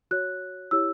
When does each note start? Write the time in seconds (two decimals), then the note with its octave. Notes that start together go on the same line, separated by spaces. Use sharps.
0.11 F#4 C#5 F#6
0.71 E4 G4 C#5 E6